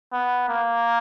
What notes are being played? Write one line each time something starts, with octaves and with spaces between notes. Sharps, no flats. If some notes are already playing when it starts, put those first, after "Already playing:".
B3
A#3